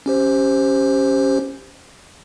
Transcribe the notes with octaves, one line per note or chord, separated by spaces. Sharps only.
C#4 G4 C5